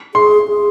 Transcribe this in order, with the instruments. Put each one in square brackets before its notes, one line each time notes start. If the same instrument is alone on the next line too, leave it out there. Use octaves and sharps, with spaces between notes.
[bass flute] G#4 [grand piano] C6
[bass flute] G#4